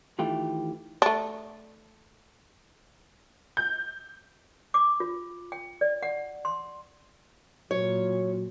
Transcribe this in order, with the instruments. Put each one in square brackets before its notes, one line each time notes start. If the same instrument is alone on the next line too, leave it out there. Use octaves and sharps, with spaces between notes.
[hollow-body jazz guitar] D#3 E3 A3 F4 G4
[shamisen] A3 D4
[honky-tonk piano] G6
[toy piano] D6
F4
G5
D5
F#5
C6
[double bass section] A#2 [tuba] F#3 [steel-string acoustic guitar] C#5